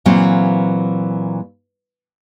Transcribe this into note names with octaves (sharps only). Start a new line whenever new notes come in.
A#2 E3 F#3 A#3 C4